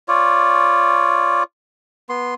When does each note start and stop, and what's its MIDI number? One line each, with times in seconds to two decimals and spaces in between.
0.08 1.43 65
0.08 1.43 73
0.08 1.43 74
2.09 2.34 59
2.09 2.34 84